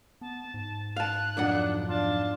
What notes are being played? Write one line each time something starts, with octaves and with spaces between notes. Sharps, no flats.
B3 A5
G#2
F5 A5 F#6
B1 F2 D4 F#5
D4 F4 A5